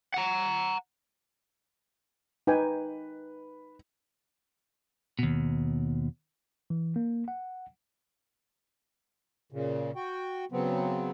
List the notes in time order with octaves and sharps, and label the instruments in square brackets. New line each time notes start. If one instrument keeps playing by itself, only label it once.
[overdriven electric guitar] F#5 A#5
[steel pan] D#4 G5 G#5 [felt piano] B4
[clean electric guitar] D#2 B2
[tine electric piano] E3
A#3
F#5
[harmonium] A#2 C#3
F#4 G5
C#3 F#3 B3 C4